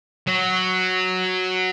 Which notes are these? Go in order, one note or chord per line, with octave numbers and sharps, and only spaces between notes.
F#3